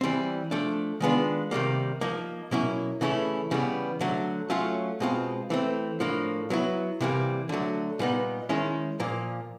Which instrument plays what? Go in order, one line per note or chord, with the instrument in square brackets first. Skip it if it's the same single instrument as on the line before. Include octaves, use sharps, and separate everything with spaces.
[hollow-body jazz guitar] E3 G3 C4
F3 A3 D4
D#3 G#3 B3 D4 F4
C3 D#3 G3 A#3
F3 A#3 D#4
B2 F#3 A#3 C#4 E4
C#3 E3 A3 C#4 E4
C#3 E3 G3 B3
D3 F#3 A3
F#3 A3 C#4 F4
B2 G#3 C4 F4
E3 A3 C4
A2 F3 A#3 D4
F#3 B3 E4
C3 E3 G3 A#3
D3 F#3 A3
A#2 G3 B3 D#4
D#3 G#3 C#4 E4
A#2 F3 A#3